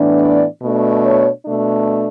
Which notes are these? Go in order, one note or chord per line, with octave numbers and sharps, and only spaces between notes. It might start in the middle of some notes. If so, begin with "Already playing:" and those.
Already playing: A2 E3 B3 D4
D5
B2 A3 D4
C#5
B2 A3 D4